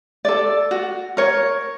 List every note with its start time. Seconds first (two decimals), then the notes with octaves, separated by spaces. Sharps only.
0.25 A4 D5
0.71 F#4
1.17 A#4 C#5